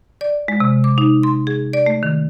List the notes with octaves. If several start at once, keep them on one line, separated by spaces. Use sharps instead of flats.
D5
G#3
C3
D6
D#4
C6
G#4
D5
A3
D#3